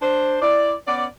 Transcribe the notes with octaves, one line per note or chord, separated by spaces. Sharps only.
D4 C5
E4 D5
B3 C#4 D5